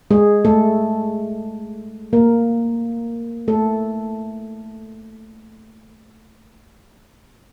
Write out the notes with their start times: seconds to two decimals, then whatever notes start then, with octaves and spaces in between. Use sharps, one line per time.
0.11 G#3 G#4
0.45 A3 A4
2.13 A#3 A#4
3.48 A3 A4